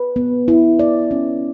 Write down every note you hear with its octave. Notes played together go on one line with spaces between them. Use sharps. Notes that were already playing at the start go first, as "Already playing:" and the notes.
Already playing: B4
B3
E4
D5
C#4